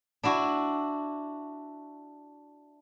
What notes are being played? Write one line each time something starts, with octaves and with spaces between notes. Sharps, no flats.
D4 E4 F#4